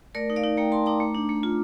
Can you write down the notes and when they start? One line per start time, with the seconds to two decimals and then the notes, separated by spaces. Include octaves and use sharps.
0.15 A3 A#4 D5
0.30 D#4
0.36 D5 F5
0.44 D#4
0.57 A3 G5 A#5
0.72 A3 A5 C6
0.86 D#4 A#5 D6
1.00 A3
1.15 D4
1.29 A3
1.43 F4